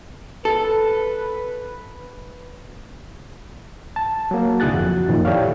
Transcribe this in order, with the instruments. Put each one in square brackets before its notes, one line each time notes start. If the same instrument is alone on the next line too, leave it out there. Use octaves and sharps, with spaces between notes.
[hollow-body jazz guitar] A4 [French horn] B4
[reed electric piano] A5
F#3 A#3
C2 D3 E4 G#4 F#6 A6
F2 F#4
F#2 A#2 D#3 F3
E4 G4 A4 C#5 D5 F5